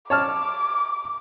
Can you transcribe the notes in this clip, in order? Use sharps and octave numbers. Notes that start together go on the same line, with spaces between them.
C#5 A5 D6 F6